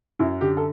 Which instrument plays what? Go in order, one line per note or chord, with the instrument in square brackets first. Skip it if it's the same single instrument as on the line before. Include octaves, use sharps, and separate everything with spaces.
[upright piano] F#2 E4
D3 G4
A4